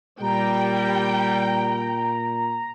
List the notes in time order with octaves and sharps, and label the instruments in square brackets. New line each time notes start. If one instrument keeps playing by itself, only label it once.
[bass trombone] A#2 [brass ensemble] G3 [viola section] G5 [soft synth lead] A#5